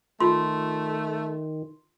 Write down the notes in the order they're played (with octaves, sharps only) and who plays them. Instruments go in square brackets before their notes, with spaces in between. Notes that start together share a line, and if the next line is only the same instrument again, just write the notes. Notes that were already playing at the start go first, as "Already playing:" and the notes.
[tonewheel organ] D#3 [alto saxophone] A3 [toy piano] F4 [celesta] C6